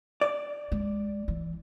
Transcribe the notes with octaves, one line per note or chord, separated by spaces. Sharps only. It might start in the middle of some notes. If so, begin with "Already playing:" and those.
D5
G#3
E3